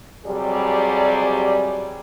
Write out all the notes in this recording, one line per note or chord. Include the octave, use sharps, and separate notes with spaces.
F2 C3 F#3 G3 G#4 D5